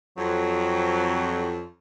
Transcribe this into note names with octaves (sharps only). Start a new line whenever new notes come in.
F2 F#3